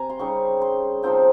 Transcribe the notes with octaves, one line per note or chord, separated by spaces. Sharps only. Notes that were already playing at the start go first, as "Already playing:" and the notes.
Already playing: C3 G#5 A#5
C6
C#3 G3 C4 D#4 C#6
C6
C3 F3 C4 D#4 G5